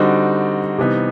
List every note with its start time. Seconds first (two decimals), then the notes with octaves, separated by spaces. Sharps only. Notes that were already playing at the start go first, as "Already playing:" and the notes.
Already playing: D3 G3 C4 D#4 F#4
0.78 C3 E3 G3 B3 D#4